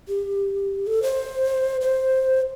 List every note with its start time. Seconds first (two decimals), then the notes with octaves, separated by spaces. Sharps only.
0.08 G4
0.87 A4
1.03 C5
1.81 C5